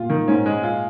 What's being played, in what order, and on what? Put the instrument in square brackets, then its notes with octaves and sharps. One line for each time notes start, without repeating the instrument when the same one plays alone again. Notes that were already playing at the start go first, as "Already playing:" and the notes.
Already playing: [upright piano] A#2 [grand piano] F4
[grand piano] D#3
[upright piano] G#2 [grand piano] C#4
[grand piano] G#3
F4